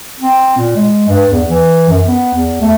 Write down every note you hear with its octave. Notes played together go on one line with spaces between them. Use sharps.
C4
A#2
G#3
G2
E2
E3
F#2
B3
E2
A3